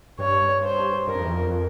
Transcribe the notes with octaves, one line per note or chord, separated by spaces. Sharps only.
G2 C#5
C5
G2 A#4
F2
E2
F2